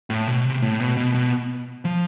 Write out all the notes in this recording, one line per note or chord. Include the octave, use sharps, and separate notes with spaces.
A2
B2
C3
A2
B2
B2
B2
F3